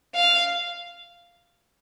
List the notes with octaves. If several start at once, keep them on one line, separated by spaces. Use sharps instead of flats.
F5